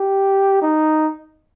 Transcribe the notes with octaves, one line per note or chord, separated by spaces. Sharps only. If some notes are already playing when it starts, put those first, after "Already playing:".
Already playing: G4
D#4